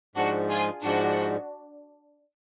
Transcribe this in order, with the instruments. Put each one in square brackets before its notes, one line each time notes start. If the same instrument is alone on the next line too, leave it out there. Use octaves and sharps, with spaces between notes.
[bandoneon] G#2 F3 G#3 [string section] D4 F#4
[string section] F4 G#4
[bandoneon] G#2 F3 G#3 [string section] D4 F#4